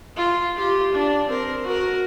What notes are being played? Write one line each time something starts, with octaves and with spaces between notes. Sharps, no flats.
F4
F4 G4
D4
C4 A#4
F#4 A#4